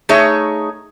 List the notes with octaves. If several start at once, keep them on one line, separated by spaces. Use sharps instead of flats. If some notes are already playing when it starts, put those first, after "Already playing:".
A3 D#4 G#4 C#5